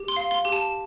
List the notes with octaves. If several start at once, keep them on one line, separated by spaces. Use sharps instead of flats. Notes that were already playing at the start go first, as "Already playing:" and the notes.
Already playing: G4
C6
F5
C6
G4
A5